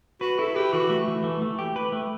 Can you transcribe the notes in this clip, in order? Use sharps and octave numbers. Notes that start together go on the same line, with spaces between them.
F#4 B4
E4 A4
G4 B4
E3 F#4
A3
E3
A3
A3
G4
B4
A3